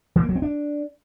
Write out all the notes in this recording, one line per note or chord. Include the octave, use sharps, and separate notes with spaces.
E3
A#3
F#3
C4
D4